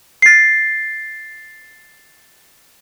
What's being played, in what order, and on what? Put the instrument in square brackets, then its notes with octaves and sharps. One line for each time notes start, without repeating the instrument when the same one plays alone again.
[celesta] A6 C7